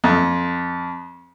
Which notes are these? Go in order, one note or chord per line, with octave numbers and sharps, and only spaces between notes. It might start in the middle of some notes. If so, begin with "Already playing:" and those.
F2